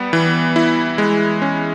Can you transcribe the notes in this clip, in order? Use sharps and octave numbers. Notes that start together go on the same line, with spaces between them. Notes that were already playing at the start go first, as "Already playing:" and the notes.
Already playing: G3 B3
E3
E4
G#3
C#4